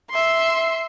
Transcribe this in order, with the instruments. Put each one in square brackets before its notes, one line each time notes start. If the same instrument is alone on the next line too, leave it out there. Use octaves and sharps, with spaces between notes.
[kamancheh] E5 C6